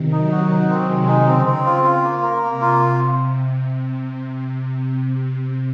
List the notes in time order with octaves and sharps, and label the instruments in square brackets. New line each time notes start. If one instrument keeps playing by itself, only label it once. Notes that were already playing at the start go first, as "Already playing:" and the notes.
Already playing: [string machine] C3 D#3
[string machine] D#3 F#3 [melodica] D#4
[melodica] F#4
D#4
C4
[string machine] C3 D#3 [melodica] G#3
[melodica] D#4
[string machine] C#3 [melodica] C4
[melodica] C4
F4
F4
A#3
A#4
[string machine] C3 [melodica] A#3
[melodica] F4